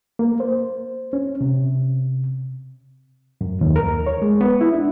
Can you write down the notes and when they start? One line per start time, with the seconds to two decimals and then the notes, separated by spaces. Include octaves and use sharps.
0.19 A#3
0.40 C5
1.13 C#4
1.41 C3
3.41 F#2
3.61 D#2
3.76 A#4
4.06 C#5
4.22 G#3
4.41 B3
4.61 E4
4.73 D4